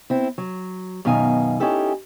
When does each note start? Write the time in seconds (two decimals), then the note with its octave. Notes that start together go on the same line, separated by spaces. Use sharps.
0.10 C4 E4
0.38 F#3
1.05 F#2 B2 D#3 D#4 F5 G#5
1.60 C#4 D#4 E4 G4 A4